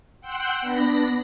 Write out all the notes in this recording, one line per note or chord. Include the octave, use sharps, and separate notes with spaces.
F#5 G5 C6 E6 F#6 G6
B3 D4 B5 A#6 B6